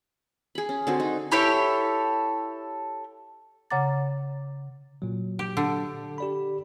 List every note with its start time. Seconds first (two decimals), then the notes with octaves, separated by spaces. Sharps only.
0.55 G#4 B5
0.69 C#4
0.87 D3 C4 F#4
1.00 D#4
1.32 E4 G4 A4 C#5
3.70 C#3 C#5 F#5 A#5 D6 A6
5.02 A#2 F#3
5.39 G4
5.57 D3
6.18 G4 D5 B5